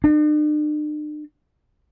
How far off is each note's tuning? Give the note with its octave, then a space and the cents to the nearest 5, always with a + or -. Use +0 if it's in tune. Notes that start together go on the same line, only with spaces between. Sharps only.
D4 +45